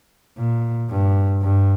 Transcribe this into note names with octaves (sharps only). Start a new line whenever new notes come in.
A#2
G2
G2